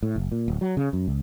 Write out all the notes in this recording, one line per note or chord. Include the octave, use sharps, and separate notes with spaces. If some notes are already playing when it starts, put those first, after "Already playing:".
A2
F#1
A#2
D1
F#3
C#3
F#2
C#2